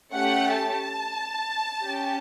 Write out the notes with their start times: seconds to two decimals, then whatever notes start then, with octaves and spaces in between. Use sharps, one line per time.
0.14 A3 C#4 G4 F#5
0.56 A5
1.82 C#4 G4